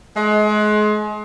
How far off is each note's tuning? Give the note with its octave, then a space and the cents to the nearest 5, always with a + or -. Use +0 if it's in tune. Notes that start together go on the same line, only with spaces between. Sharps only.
G#3 +30